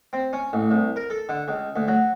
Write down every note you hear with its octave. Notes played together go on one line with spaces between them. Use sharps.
C4
C#4
A1
C2
A#4
A4
D3
C#2
D2
F#3